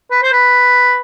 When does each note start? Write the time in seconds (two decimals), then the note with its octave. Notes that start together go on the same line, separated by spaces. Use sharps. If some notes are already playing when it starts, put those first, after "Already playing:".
0.11 B4
0.23 C5
0.32 B4